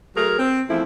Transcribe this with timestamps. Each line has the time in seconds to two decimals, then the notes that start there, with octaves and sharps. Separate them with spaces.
0.16 F#3 A3 G#4 A#4
0.39 C4
0.69 E2 F3 A3 C4 E4